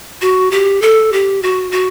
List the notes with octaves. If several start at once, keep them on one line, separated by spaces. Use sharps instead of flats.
F#4
G4
A4
G4
F#4
F#4